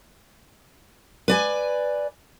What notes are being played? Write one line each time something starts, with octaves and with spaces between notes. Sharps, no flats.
B4 D5 G#5